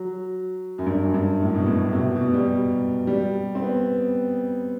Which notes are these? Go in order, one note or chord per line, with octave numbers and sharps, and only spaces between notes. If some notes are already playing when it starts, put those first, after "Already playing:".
Already playing: F#3
F#2
G2
F#2
G2
A2
B2
A2
C3
B2
B2
G3
G3
C4
B3